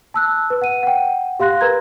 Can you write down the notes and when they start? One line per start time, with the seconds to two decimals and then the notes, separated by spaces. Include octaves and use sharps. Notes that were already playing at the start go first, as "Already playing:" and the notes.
0.14 A5 E6 F#6
0.50 B4
0.62 F#5 D#7
0.83 F#5 G5
1.40 G4 F5 C6 F#6 A#6
1.61 A#4 B4 A#5 G#6